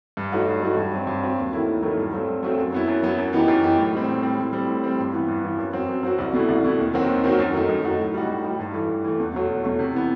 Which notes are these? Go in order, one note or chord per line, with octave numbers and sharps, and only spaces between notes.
G2
F#3 A3 D#4 F#4
G2
F#3 A3 D#4 F#4
G2
F#3 C4
G2
F#3 C4
D#2
D#3 F#3 A3 E4
D#2
D#3 F#3 A3 E4
G2
F#3 A3 C4
G2
F#3 A3 C4
F#2
F#3 B3 E4
F#2
F#3 B3 E4
F#2
E3 B3 D#4 G4
F#2
E3 B3 D#4 G4
A2
G3 C4
A2
G3 C4
A2
G3 C4
A2
G3 C4
G2
E3 B3
G2
E3 B3
F#2
F#3 C4 F#4
F#2
F#3 C4 F#4
C2
B2 A3 E4
C2
B2 A3 E4
D#2
D#3 F#3 C4 F#4
D#2
D#3 F#3 C4 F#4
F#2
D#3 A3 D#4 F#4
F#2
D#3 A3 D#4 F#4
A2
G3 D#4 F#4
A2
G3 D#4 F#4
G2
E3 A3
G2
E3 A3
E2
B2 F#3 A3
E2
B2 F#3 A3
C3
E3 B3